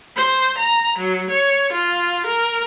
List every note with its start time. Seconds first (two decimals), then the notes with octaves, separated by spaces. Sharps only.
0.17 C5
0.58 A#5
0.98 F#3
1.30 C#5
1.72 F4
2.26 A#4